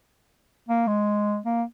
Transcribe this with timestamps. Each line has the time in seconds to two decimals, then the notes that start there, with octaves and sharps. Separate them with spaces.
0.68 A#3
0.87 G#3
1.45 A#3